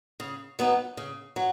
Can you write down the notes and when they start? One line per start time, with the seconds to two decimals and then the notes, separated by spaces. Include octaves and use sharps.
0.20 C#3
0.59 F#3 B3 D#4
0.97 C#3
1.36 F#3